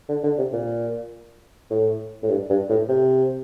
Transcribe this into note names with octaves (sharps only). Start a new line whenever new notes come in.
D3
D3
C3
A#2
A2
A2
G2
G2
A2
C3